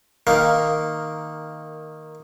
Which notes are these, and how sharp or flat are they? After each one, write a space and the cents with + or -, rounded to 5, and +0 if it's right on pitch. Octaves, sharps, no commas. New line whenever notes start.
D#3 +0 A#3 -5